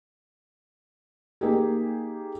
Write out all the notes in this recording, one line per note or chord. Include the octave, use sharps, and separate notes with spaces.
A#3 D#4 G4 G#4